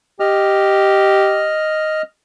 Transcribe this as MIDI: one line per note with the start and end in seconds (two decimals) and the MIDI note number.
0.20 1.59 67
0.20 2.02 75
0.20 2.02 89